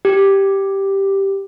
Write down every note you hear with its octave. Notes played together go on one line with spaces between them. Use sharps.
G4